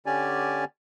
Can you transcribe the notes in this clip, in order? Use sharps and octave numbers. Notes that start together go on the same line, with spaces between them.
D3 C#4 G4 D5 G#5